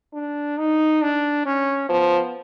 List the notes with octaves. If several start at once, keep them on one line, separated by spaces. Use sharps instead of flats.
D4
D#4
D4
C#4
F3 B3